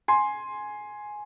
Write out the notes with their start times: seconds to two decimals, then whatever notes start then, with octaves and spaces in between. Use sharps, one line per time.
0.08 G#5 C6